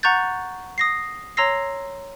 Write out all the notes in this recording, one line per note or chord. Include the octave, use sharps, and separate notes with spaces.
F#5 A#5 C#6 F#6 G6 A6
D#6 A#6 C7
C#5 A#5 C6 E6 A#6 C7